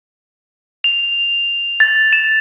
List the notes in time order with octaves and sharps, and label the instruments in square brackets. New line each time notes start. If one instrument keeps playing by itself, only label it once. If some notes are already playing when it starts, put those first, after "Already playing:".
[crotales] F7
A6
E7